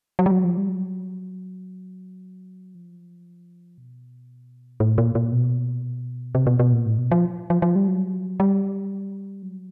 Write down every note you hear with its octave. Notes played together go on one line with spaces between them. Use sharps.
F#3
G3
F#3
F3
G3
F#3
F3
B2
A2
A#2
A#2
B2
C3
B2
B2
A#2
A2
B2
F3
F3
F3
G3
F#3
G3
F#3